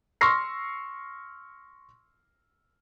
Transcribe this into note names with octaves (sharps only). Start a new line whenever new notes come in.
C6 C#6 E6 F6 A#6 C7